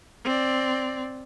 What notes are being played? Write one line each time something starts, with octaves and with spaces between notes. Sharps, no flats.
C4 D5